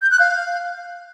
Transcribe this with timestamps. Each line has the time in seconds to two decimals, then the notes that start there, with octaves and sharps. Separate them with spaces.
0.02 G6
0.11 F#6
0.20 F5